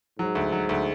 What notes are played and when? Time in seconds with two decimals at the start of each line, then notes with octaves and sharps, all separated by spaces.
0.19 G#2 F#3
0.35 D2
0.52 F#3
0.69 D2